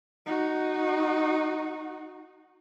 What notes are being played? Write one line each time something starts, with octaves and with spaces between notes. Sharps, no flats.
D#4 F#4